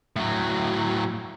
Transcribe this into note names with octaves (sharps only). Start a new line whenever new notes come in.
A2 F#3